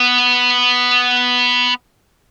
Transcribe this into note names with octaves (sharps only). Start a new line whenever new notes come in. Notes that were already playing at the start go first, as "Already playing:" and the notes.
Already playing: B3